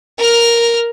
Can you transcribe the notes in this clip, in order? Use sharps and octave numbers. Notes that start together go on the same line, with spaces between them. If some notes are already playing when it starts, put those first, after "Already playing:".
A#4 F6